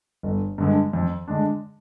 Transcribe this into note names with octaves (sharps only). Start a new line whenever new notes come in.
G1
G2 D3 G#3
F2
D3 G#3 D4